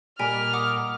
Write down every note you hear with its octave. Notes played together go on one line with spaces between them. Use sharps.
A#2 G3 A#4 D#5 G#5 F6 B6 D7
F#5 D6 D#6